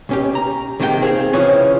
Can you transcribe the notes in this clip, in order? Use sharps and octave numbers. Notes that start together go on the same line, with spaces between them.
B1 C#4 G4
A#5
C3 D#3 G#3 A#3 G#4 G5
C4 G#4 F5
C#3 E3 F3 C#4